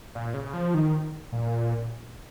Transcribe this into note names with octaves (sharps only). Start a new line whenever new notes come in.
A#2
C#3
F3
D#3
A#2